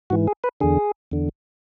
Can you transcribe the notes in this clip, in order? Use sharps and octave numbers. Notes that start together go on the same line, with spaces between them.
G#2 E3 F#4
G#4
B4
E2 D3 G#4
E2 D3